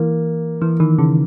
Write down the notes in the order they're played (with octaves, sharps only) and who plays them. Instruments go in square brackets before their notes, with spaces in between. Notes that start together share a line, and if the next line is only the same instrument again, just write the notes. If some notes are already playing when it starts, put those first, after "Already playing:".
Already playing: [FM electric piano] E3 [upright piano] A#3
[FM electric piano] E3
D#3
C#3